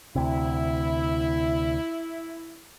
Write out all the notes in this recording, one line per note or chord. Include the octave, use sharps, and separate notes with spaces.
D2 C3 E4